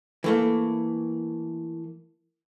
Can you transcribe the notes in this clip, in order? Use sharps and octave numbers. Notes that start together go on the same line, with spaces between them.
E3 A3 A#3